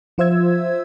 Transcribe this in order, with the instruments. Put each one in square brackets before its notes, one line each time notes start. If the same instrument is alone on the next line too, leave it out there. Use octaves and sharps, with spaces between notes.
[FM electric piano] F3 F4 C5 E5 E6 G#6